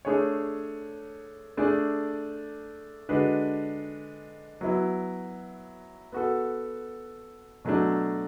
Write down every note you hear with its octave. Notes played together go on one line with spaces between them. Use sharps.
A3 D4 G#4 C#5
A3 D4 G#4 D5
D3 G#3 D4 F#4 B4
F#3 B3 E4
B3 F#4 A4
B2 F#3 A3 D4